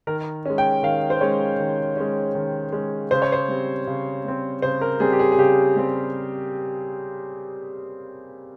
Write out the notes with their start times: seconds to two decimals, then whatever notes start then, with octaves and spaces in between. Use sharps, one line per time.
0.07 D#3 A#4
0.46 G#3 C#4
0.58 G5
0.83 D#3 F5
1.10 C5
1.21 G#3 C#4 C#5
1.60 D#3
1.97 G#3 C#4
2.35 D#3
2.72 G#3 C#4
3.11 C#3 C5
3.22 C#5
3.32 C5
3.48 G3 C4
3.87 C#3
4.25 G3 C4
4.62 C#3 C5
4.81 A#4
5.00 G3 C4 G#4
5.13 G4
5.19 G#4
5.32 G#4
5.38 C#3 G4
5.76 G3 C4